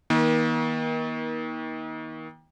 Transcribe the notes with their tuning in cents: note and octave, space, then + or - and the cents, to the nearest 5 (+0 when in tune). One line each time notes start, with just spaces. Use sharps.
D#3 +30 A#3 +40